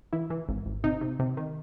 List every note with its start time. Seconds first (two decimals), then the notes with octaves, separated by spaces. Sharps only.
0.13 E3 E4
0.30 E3
0.49 G#1
0.66 G#1
0.84 C3 D#4
1.01 C3
1.19 C3
1.37 D#3